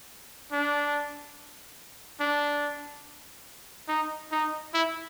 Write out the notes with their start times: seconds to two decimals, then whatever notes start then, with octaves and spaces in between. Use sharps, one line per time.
0.52 D4
2.20 D4
3.89 D#4
4.32 D#4
4.74 E4